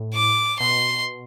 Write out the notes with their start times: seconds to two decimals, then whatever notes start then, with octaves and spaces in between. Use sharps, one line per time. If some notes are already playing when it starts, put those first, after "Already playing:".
Already playing: A2
0.14 D6
0.60 B2 C6